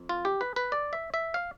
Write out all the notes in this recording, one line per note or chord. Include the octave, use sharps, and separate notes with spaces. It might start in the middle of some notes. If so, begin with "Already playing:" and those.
Already playing: F2
F4
G4
B4
B4
D5
E5
E5
F5